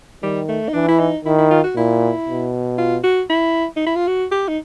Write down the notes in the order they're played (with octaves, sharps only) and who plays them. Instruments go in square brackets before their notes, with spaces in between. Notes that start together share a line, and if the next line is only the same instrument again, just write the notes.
[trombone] D#3 [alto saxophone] G3
[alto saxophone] A3
D#4
[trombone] E3 [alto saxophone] D4
[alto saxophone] E4
D#4
[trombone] D#3 [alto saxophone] E4
[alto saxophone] E4
F4
F#4
[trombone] A#2 [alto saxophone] E4
[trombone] B2
[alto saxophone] F4
F#4
E4
D#4
E4
F4
F#4
G4
D#4